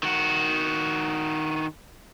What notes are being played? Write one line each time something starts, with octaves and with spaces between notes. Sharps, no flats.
D#3 F#4